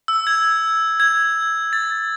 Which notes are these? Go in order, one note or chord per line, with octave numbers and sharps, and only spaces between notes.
E6
G#6
G#6
A6